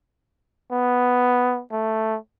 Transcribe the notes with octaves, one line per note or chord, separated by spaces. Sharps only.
B3
A3